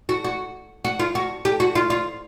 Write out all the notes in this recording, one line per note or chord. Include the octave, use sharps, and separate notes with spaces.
F#4
F#4
F#4
F4
F#4
G4
F#4
F4
F4